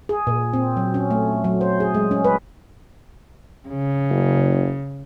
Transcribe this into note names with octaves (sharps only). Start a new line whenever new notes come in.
G#4
A#2
C4
F#3
C#4
A3
F#3
C5
G#4
G#3
C#4
B4
C#3
F#1